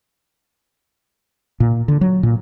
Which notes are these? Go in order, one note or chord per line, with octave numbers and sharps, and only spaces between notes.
A#2
D3
F#3
A#2